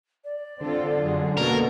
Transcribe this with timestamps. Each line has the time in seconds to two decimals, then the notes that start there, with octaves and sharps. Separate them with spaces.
0.24 D5
0.61 D3 C4 F4 A4
1.02 F#2 G#4
1.37 B2 A#3 F#4 A4 A#4